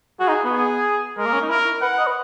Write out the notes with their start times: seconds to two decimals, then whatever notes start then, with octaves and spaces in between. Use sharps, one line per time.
0.20 F#4 G#4
0.29 D#4
0.45 B3
0.53 G#4
1.17 G#3 A#4
1.26 A#3
1.33 C#4
1.42 D#4
1.49 E4 A#4
1.82 B4 F#5
1.99 D#5
2.07 B4